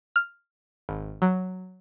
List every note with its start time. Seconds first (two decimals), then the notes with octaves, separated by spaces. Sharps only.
0.16 F6
0.89 G#1
1.22 F#3